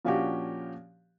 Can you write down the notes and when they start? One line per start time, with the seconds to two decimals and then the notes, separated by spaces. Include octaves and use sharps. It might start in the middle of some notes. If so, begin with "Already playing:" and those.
0.05 A#2 F3 C#4 D4 F#4 G4